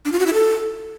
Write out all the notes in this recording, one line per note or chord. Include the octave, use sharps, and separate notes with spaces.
D4
F4
F#4
E4
A4